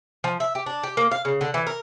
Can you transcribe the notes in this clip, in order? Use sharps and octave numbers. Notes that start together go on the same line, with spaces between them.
F3
E5
G4
D4
G4
A#3
F5
C#3
D3
E3
A#4